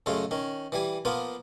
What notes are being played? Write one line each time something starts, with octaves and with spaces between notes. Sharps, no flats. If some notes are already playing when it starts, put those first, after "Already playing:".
F#2 C#3 G#3 A3 F4
D#3 C#4
E3 G3 G#5
F3 A#3 B3 F4